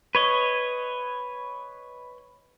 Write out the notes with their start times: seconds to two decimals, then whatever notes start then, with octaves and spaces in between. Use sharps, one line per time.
0.15 B4 C#5 D#5